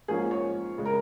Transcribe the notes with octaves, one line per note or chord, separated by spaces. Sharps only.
G#2 F3 A#3 C#4 G#4
C#5
C#3 G#3
A#4